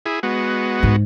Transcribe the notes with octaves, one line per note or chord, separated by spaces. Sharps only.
E4 G#4
G#3 B3 F#4
G#2